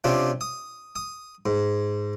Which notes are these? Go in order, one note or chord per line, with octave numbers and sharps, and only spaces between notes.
C3 C#4 D4 F4
D#6
D#6
G#2